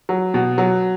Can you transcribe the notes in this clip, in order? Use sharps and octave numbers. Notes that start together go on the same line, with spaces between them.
F#3
B2
F#3